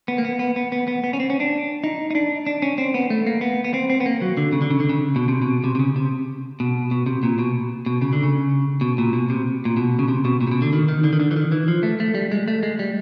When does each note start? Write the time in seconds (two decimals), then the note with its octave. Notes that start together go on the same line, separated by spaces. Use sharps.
0.08 B3
0.18 A#3
0.25 B3
0.39 B3
0.56 B3
0.72 B3
0.88 B3
1.04 B3
1.13 C#4
1.20 C4
1.30 C#4
1.40 D4
1.84 D#4
2.11 D#4
2.15 D4
2.47 D4
2.62 C#4
2.78 C4
2.94 B3
3.10 A3
3.26 A#3
3.41 B3
3.65 B3
3.74 C4
3.90 C4
4.00 B3
4.06 A#3
4.22 F#3
4.37 D3
4.52 C#3
4.62 D3
4.70 C#3
4.80 D3
4.89 C#3
5.16 B2
5.28 C3
5.42 B2
5.64 C3
5.75 C3
5.79 C#3
5.96 C3
6.60 B2
6.91 B2
7.06 C3
7.23 A#2
7.39 B2
7.86 B2
8.02 C#3
8.13 D3
8.23 C#3
8.81 B2
8.98 A#2
9.13 B2
9.30 C3
9.65 A#2
9.77 B2
9.99 C#3
10.08 C3
10.25 B2
10.41 A#2
10.47 C3
10.52 B2
10.62 D3
10.73 D#3
10.89 D#3
11.04 D3
11.13 D#3
11.20 D3
11.31 E3
11.36 D#3
11.52 E3
11.68 F3
11.83 A3
12.00 A3
12.15 G3
12.32 G#3
12.48 A3
12.63 G#3
12.79 G3